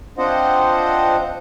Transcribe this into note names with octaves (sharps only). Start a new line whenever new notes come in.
C4 D4 F4 C5 D#5 F#5